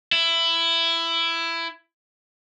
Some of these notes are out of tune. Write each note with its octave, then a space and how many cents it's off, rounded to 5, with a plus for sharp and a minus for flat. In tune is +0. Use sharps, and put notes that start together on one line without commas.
E4 +15